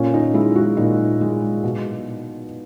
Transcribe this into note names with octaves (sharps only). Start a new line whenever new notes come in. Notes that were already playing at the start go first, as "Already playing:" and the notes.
Already playing: A#2 C#4
D#4
G#3 E4
F#4
A#2 D#4
G#3
B2